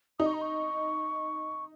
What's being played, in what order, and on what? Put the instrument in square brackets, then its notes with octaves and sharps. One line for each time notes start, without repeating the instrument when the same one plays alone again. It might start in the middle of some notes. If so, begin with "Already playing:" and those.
[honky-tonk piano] D#4 [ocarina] D#6
[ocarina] C#6
A#5
C#6